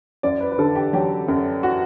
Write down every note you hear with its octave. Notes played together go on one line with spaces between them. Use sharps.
F#2 D5
B4
B4
D3 A4
G4
F#3 G4
F#2
F#4